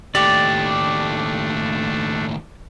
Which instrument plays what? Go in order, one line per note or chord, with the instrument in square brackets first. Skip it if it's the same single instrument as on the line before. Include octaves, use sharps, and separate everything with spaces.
[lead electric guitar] D#2 A2 [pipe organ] A3 D4 [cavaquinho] G4 C#6 [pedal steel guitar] D5